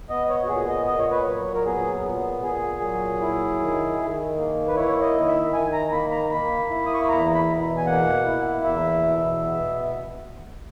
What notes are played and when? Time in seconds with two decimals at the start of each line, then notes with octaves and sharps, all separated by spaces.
0.10 B3 D#5
0.29 C#5
0.44 F#4
0.49 A#2 G#4
0.69 D#5
0.88 A#2 D#5
0.99 C#5
1.11 B4
1.22 F#3 C#5
1.54 A#4
1.65 B3 G#4
2.04 A#2
2.43 A#2 G#4
2.81 F#3
3.21 E4
3.59 D#3
3.98 D#3
4.37 A#3
4.68 B4
4.76 E4 C#5
5.01 D#5
5.15 D#3
5.27 E5
5.53 D#3 G#5
5.73 A#5
5.92 A#3 B5
6.12 A#5
6.31 A#3 B5
6.70 E4
6.86 D#6
6.94 C#6
7.01 B5
7.09 E2 A#5
7.35 B5
7.47 B2
7.77 G#5
7.86 A#3 F#5
8.25 E4
8.64 E2 E5
9.03 B2
9.42 B3